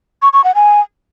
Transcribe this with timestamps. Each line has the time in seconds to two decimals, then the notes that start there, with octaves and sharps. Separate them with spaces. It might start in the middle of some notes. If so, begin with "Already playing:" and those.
0.22 C#6
0.33 C#6
0.44 F#5
0.55 G#5